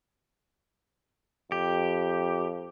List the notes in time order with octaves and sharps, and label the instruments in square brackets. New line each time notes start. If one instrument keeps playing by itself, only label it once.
[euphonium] F2 [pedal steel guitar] G4